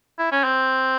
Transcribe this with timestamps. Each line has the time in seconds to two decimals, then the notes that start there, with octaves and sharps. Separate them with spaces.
0.19 E4
0.32 C#4
0.44 C4